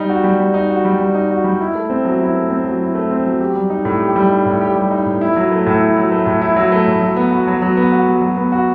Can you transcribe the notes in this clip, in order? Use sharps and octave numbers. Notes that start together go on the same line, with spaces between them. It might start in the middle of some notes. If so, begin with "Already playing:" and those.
Already playing: G3 D#4
F#4
G3
G3
D#4
F#4
G3
G3
D#4
F#4
G3
E4
A3
C4
F#3
E4
A3
C4
F#3
E4
A3
C4
F#3
G4
G3
D#4
A2
G4
G3
D#4
A2
G4
G3
D#4
A2
E4
F#3
A3
A2
E4
F#3
A3
A2
E4
F#3
A3
A2
F#3
B3
F#4
F#3
F#3
B3
F#4
F#3
F#3
B3
F#4